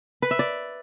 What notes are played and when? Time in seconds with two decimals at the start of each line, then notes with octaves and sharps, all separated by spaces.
0.22 B4
0.31 E5
0.39 D5